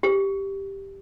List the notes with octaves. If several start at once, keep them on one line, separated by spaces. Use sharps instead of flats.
G4